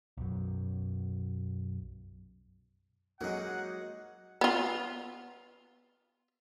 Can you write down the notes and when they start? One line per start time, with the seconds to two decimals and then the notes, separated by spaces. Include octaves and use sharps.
0.17 B1 F#2
3.21 F#3 G#3 A#3 D#4 F#4 G#4 F#5
4.41 B3 F4